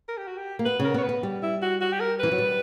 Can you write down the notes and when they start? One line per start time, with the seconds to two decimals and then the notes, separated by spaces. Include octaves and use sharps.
0.08 A#4
0.17 G4
0.27 F#4
0.38 G4
0.59 A#3
0.65 B3 B4
0.80 C#3
0.85 A#4
0.94 B3 C#5
1.03 B4
1.09 B3
1.23 G3
1.43 E4
1.62 F#4
1.81 F#4
1.93 G4
2.00 A#4
2.19 E3 B4
2.31 F#3
2.38 G3